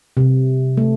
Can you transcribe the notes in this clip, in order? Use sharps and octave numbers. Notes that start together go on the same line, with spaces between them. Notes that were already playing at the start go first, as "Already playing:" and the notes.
C3
A3